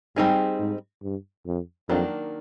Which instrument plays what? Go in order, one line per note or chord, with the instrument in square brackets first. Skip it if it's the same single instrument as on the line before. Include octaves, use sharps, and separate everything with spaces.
[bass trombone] G#2 [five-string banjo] G3 C4 D#4 G#4
[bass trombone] G#2
G2
F2
[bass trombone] F2 [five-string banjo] D#3 F#3 A#3 D4